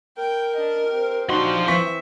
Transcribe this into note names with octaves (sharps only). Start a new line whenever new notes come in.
A#4 G5
D4 D#5
C4 G4
F3 D4 D#4 F#4 C6
E3 C4 E5 C#6 B6